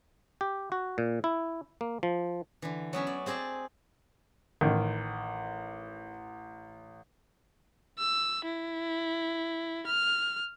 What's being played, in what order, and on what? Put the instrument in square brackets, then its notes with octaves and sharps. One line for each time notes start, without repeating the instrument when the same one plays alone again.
[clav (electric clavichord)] G4
F#4
A#2
E4
A#3
F3
[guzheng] D3 E3
F#3 B3 C#4 E5
D5
C4 G#4 D5 D#5 A5
[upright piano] A1 [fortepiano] D#3
[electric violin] E6
E4
F6